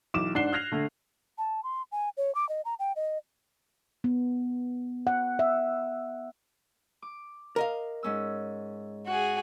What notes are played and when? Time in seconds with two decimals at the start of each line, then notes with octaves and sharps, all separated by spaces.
0.14 B1 E3 D6 E7
0.35 G#2 D4 F#5 F#6 C7 G7
0.53 F6 F#6 G#6 A#6 C7 F7
0.72 D3 A3
1.38 A5
1.64 C6
1.92 G#5
2.17 C#5
2.35 D6
2.49 D#5
2.65 A#5
2.79 G5
2.96 D#5
4.04 B3
5.07 F#5
5.39 E5
7.02 D6
7.56 A#4 D#5 F5
8.03 G#2 C#4 E6
9.07 F#4 G#4 F#5